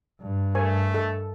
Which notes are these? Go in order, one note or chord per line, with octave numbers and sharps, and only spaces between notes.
G2
A3 G4 A#4 C5 G#5
A4 D#5